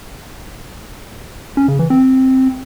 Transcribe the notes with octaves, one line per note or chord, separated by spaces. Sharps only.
C#4
C#3
E3
C4